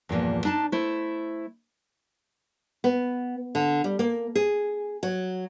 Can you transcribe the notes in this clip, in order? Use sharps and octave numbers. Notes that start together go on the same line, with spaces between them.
E2 G2 A#2 F3
D4 D#4 A5
A3 E4 C5
B3
D3
G3
A#3
G#4
F#3